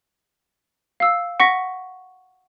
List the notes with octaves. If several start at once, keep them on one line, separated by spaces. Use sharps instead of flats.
F5 E6
F#5 C#6 A#6 B6